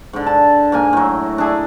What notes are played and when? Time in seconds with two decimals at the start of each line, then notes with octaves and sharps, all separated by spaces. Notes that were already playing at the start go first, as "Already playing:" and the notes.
0.13 G#2 D3
0.26 A5
0.72 G#2 A#3 G#5
0.93 A2 F#3
1.38 D4 E4 G#4